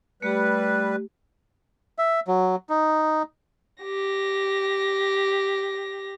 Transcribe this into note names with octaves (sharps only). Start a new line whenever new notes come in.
G3 A3 G4 B4
E5
F#3
D#4
G4 A#6